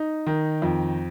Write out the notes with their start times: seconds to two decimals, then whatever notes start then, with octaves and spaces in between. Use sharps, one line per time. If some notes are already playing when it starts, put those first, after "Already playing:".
Already playing: D#4
0.27 D#3
0.62 F2